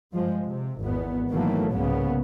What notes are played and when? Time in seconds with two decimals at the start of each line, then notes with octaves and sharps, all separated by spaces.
0.12 G2 F3 G#3
0.43 C3
0.80 G#1 E2 B3
1.30 B2 D#3 E3 F#3 A3 A#3
1.73 C2 G#2 C#3 A#3 B3